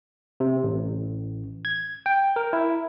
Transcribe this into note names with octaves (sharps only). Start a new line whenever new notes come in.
C3
A1
G#6
G5
A#4
E4